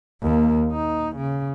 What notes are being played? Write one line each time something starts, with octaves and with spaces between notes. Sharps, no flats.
D#2 A#3
D#4
C#3